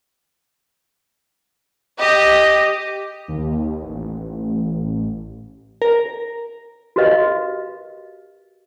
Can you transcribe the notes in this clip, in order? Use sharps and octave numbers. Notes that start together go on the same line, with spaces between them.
G4 D#5
D#2
A1
A#4
F#4 G4 A#4 B4 D#5 F5